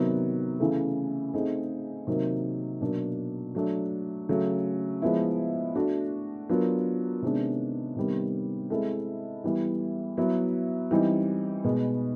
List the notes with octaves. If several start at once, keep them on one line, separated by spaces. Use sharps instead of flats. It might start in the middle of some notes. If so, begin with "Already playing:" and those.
Already playing: C3 D#3 F#3 B3
C#3 E3 A3
A3 C4 D#4 G#4
C3 D#3 F#3 A#3 D#4
B2 F#3 A#3 D4
F#3 A3 D4
C#3 F#3 A3
F3 G#3 B3 E4
A3 D4 F#4
F#3 B3 D4 F4 A#4
C3 D#3 G#3 B3 D4
C3 D#3 G3 B3
G#3 C4 E4 A4
E3 G3 B3 E4
F#3 B3 E4
E3 G3 C4 D#4
B2 G#3 B3